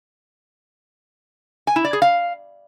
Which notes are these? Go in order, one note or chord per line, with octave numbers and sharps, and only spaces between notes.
G#5
E4
D5
G#4
F5